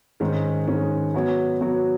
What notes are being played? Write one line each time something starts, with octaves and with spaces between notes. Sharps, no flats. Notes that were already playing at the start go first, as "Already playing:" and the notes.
G#2 D#3 G#3 C#4
G#2 D#3 G#3 C#4
F#3 B3 F#4 C#5
F#3 B3 F#4 C#5